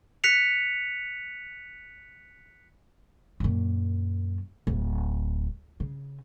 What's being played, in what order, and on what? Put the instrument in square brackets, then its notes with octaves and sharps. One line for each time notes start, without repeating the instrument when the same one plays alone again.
[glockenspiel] F#6 B6 C#7 F7
[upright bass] F#2 A#2
D1
C#3